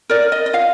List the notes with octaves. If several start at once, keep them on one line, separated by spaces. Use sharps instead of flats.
A#4 D5
D#5
D#5
F4 F5